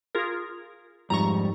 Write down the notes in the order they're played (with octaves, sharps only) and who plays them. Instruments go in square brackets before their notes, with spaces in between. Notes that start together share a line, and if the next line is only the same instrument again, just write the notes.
[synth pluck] F4 G#4 A#4
[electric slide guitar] F2 G3 [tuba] G#2 [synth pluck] A#5 C#6